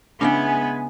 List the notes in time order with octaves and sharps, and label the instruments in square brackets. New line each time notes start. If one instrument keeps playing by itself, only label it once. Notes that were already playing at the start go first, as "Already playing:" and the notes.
[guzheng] C#3 E4 G5 [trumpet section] G#3 G#5 [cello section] B3 [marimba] D4